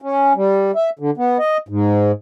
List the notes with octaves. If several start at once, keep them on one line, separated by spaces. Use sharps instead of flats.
C#4
G3
E5
D3
B3
D#5
G#2